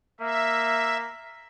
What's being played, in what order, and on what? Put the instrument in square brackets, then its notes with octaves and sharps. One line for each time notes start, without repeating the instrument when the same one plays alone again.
[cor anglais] A#3 [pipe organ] E5